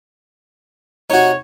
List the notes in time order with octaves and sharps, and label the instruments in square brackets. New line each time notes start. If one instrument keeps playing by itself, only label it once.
[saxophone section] C3 C#5 [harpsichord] D#4 F#4